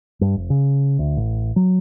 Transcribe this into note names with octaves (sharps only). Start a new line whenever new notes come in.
G2
F1
C#3
D2
A1
F#3